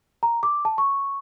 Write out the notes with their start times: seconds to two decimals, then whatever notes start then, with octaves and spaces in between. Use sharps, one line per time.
0.23 A#5
0.43 D6
0.65 A5
0.78 C#6